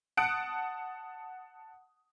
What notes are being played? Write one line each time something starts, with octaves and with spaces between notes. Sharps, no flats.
F#5 A5 D#6 F#6 C#7 D7